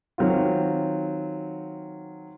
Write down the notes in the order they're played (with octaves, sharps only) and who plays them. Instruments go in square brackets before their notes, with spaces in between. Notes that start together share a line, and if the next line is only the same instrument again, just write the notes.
[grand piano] D#3 F#3 C4 F4